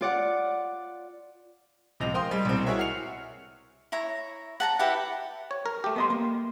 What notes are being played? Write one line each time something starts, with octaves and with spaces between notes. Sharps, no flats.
F4 D5 F#5
C#2 C3 F3 G#3 A#6 F7
A#4 C5 F5 G5 C6 D#6
G3 G#3
C2 B2 C4
E4 F#4 G#4 A#4 C#5 E5
F#5 F6 C7 C#7 F7
E4 C#5 A#5
F#5 A5 A#5
E4 G4 B4 F#5
C#5
A#4
A3 G4
B3 D#5 C6
A#3